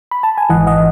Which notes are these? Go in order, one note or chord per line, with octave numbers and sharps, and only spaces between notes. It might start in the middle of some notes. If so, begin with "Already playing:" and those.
B5
A5
G#5
G#1 G#2 E3 D#5 F#5
D#5 F#5